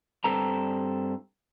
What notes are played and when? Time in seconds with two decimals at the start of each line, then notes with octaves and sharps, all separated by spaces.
0.24 G2 C4 A4 A#5